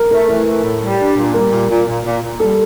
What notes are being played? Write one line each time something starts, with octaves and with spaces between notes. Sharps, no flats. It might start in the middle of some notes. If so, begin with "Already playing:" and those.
Already playing: A#4
A3 A#4
E3 A#4
A3
A2
G3
D4
A#2
G3 A#4
A#2
A#2
A#2
A#2
A#2
G3 A4